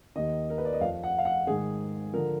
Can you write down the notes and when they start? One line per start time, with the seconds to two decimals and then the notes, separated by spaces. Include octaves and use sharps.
0.16 D#2 D#3 D#5
0.50 A#4
0.58 B4
0.65 D5
0.73 D#5
0.81 F2 F5
0.85 F3
1.04 F#5
1.18 F5
1.25 F#5
1.47 G#2 D#3 G#4
2.13 D3 F3 A#4